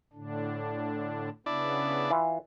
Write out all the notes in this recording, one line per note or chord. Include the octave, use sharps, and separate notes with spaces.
A2 D3 D4
C#3 B3 D4 E4 D5
E3 F4